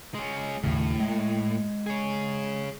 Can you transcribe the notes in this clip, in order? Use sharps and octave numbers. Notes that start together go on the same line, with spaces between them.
G#3 C#4
D#2 A2 C#3
G#3
G#4 C#5